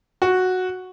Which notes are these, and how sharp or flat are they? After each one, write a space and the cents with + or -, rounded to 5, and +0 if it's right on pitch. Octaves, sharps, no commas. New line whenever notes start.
F#4 -5